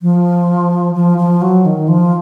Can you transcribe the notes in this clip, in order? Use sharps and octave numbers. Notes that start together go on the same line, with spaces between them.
F3
F3
F3
F#3
D#3
F3